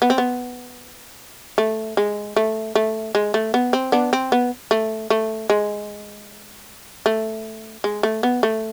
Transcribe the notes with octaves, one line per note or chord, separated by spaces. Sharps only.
B3
C4
B3
A3
G#3
A3
A3
G#3
A3
B3
C4
B3 D4
C4
B3
A3
A3
G#3
A3
G#3
A3
B3
A3